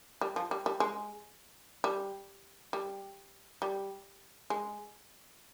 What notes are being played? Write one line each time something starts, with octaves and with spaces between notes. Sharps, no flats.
G3
F3
G3
G3
G#3
G3
G3
G3
G#3